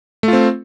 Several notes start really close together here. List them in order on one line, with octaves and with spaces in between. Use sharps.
A3 F4 C4